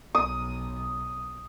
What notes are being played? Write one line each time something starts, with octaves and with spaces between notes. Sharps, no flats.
B1 D#6